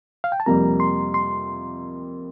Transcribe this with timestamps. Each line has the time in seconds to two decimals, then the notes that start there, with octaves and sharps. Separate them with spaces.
0.24 F5
0.32 G5
0.40 A5
0.46 F2 C3 G3 A#3 A#5
0.80 C6
1.14 C6